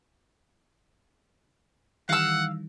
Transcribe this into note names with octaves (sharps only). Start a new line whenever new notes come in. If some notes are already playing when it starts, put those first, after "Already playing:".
D#3 E3 G3 F5 F#5 E6